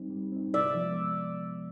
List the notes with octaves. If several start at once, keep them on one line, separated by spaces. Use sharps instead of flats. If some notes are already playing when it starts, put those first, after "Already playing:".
Already playing: G3 C4 D#4
G3
C4 D#4
C3 D5 E5
F3 G#3 B3